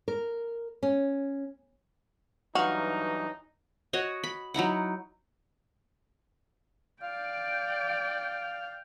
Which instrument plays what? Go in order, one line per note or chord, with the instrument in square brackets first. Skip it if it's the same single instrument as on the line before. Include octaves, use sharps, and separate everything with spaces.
[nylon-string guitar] A#4
C#4
[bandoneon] G2 E3 F#3 [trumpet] D#4 [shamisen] F#4 [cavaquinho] F5 C#6
[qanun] F#4 C#5 D#5
B5
F#3 D#4 E4 F#5
[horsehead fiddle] D5 G5 [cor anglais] F5
[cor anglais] F5